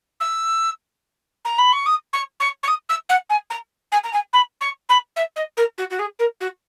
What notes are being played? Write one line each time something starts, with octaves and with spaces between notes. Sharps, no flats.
E6
A#5
B5
C#6
D#6
C#6
C#6
C#6
D#6
E6
F#5
G#5
A#5
G#5
A#5
G#5
B5
C#6
B5
E5
D#5
A#4
F#4
F#4
G#4
A#4
F#4